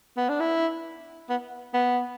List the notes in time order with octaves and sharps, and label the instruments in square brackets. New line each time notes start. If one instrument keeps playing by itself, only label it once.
[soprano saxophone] B3
D4
E4
B3
B3